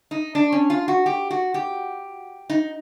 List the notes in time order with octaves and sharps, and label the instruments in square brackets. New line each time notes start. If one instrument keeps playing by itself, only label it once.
[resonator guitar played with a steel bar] D#4
D4
C#4
F4
F#4
G4
F#4
G4
D#4